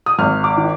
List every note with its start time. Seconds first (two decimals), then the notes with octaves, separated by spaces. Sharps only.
0.06 D#6
0.19 G#1 F6
0.44 D6
0.57 D#3